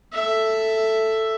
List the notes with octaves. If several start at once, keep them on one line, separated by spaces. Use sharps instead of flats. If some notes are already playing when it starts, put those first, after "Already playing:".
A4 E5